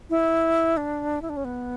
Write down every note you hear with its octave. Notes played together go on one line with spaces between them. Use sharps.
E4
D4
E4
D4
C#4
B3